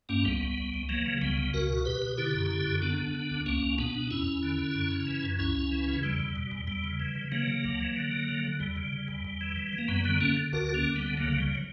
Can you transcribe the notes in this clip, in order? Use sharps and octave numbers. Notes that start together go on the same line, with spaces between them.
G2 A#3 C#4
C#2 G3 B3
C#2
C#2
C#2
E3 F#3 A#3
C#3
C#2 G3 B3
C#3
C#2 F#4 A#4
B2
B2 G4 B4
B2
D3 E4 G4
F#2
D3
F#2
D3 B3 D4
D3
D3
D2
C#2 A#3 C#4
C#2
B2 B3 D4
B2
E2 C#4 E4
E2
D3
D3
F#2
C#3
E3
F#2
C#2 C#4 E4
C#2
E3
C#3
E2 G3
E2
B2
E2
E2 G3
C#3
E3
C#3
E3 F#3 A#3
C#3
D2
E3
D3
D3
D3
D3
E2 G3
C#3
C#3
E2
E2
E3
E3
E3
A#3
F#2 G3 B3
D3 G3 B3
D3 A#3 C#4
D3
D2 F#4 A#4
D3
A#3 C#4
D2
G3 B3
D3
C#3 F#3 A#3
C#2 F#3
G3
F#3